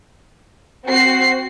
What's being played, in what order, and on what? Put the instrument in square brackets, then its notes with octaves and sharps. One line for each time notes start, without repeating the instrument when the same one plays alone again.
[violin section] C4 F#4 C7